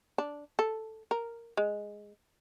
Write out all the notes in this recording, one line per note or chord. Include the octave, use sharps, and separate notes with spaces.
D4
A4
A#4
G#3